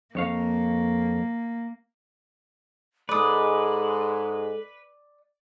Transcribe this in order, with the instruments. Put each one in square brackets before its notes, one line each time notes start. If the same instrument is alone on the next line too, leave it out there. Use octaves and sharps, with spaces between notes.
[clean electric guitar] F2 C#5 F5 [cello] A#3
[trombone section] G#2 G#3 [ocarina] A4 [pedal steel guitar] B4 [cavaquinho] D5 D#6